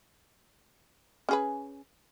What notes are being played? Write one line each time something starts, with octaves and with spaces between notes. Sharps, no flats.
C#4 G#4 B4